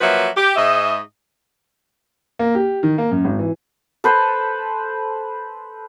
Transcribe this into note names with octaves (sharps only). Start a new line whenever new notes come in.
F3 F#3 A#3 F#4 B4 E5
G4
G#2 D#5 E5
A#3
G4
D#3
A#3
F#2
G#1
E3
A4 B4 C5